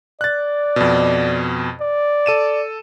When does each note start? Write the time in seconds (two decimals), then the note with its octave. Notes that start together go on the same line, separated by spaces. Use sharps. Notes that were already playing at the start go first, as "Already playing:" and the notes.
0.21 D5 F#6 A6
0.76 F2 B2
1.81 D5
2.26 A4 D#7 E7